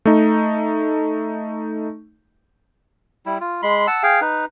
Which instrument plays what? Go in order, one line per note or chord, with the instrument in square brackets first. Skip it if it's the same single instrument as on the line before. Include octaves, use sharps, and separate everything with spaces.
[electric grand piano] A3 D#4
[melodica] G3 E4
F4
G#3 B5 C6
F#5 A5 E6
G#4 F5 G5
D#4 B4